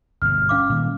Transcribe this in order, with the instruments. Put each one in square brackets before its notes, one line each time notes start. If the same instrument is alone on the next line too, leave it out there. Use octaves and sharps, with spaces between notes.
[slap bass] G1 B2 [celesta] F6
[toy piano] C#4 F5 D6
[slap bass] A#2 D#3 G3